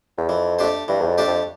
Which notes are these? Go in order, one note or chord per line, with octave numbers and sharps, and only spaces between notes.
E2
F2 E3
A3 D4 G4 C5
G2 E3
E2
F2
A3 D4 G4 C5
F2